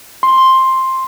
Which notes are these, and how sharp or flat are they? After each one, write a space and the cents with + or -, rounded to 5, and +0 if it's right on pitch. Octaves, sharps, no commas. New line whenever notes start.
C6 +10